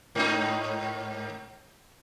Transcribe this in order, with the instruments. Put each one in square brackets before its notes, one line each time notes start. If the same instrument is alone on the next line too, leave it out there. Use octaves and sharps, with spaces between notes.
[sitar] G#2 D#4